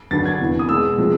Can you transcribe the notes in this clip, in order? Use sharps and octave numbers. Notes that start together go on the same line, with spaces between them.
G2 D3 F#3 A6
G#6
E2 C3 E3
D#6
B2 G#3 E6
C3 F3 G#3